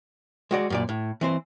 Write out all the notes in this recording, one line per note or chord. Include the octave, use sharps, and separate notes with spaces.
G#3 F#4 D5
F#2 A#2 D5
A2
E3 C4 C5